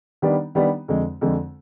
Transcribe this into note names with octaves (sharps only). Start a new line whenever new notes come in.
D#3 G3 B3 D4 G4
D#3 G3 B3 D4 G4
F2 D3 G#3
F2 D3 G#3